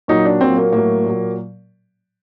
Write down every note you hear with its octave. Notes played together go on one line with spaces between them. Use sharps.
A#2 F#3 D#4
D4
A#2 F#3 C4
A#3
A2 F#3 A#3
A#2 F#3